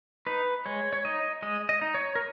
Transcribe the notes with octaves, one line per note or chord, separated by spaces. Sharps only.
D#4 B4
G#3 C#5
C#5
D#4 D#5
G#3 D#5
D#5
D#4
C#5
A#4